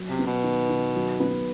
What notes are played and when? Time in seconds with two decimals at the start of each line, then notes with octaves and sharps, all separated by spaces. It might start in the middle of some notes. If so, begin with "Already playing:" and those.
Already playing: F#3
0.09 C3
0.19 B3
0.26 B2
0.43 D#3
0.69 D#3
0.95 F#3
1.20 B3